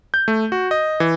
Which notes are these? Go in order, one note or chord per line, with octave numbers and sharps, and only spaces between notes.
G6
A3
F#4
D#5
E3